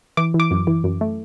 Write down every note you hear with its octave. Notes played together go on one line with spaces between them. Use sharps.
E3 D6
E3
D6
F#2
E3
F#2
A3